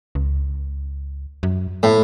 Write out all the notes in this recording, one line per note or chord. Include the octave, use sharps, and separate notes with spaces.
C#2
F#2
A2 A3